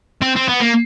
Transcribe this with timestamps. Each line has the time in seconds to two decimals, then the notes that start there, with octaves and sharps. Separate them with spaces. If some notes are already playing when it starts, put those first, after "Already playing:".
0.22 C4
0.36 C4
0.49 B3
0.60 A#3